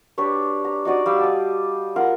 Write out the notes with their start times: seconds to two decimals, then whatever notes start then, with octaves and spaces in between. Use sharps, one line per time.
0.18 D4 G4 B4 C#5
0.65 A#5
0.85 D#4 F#4 D5 D#6
1.06 G3 F5 E6
1.21 A5 D#6
1.96 F4 A#4 F#5